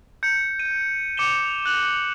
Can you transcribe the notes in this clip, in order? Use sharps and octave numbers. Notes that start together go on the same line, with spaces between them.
G6 C#7
D#7
D6 C#7 E7 G7
F#6 F#7